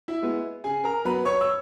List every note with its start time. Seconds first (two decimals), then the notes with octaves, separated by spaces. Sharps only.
0.08 E4 E5
0.22 G#3 B3
0.64 C#3 G#4 G#5
0.84 A#4 A#5
1.05 F#3 B3 B4 B5
1.25 C#5 C#6
1.41 E6